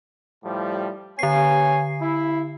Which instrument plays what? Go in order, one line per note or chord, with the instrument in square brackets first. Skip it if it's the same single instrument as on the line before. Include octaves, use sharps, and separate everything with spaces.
[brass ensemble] A2 F3 G3
[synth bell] D3 C7 [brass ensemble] B3 C#5 G#5
[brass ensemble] E4